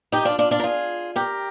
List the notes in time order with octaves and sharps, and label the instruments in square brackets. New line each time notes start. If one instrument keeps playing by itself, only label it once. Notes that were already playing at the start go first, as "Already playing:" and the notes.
[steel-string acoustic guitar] D#4 G4
D4 F4
D4 F4
D4 F4
A#4
F4 G#4
G4 A#4